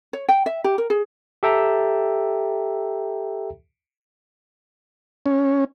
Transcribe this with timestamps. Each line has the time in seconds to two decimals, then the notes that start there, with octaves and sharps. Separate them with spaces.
0.13 C#5
0.29 G5
0.46 E5
0.64 G4
0.78 A#4
0.90 G#4
1.43 G4 A4 E5 G5 A#5
5.26 C#4